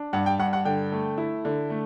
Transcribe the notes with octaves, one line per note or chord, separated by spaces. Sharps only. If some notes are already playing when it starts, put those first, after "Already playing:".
Already playing: D4
G2 F#5
G5
G2 F#5
F#5
D3 G5
A3
E4
D3
A3